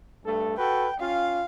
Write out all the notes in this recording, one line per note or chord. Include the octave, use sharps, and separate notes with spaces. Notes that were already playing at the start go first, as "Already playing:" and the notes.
G2 A3 A4
F#4 A4 B4 G5
C#4 F4 F5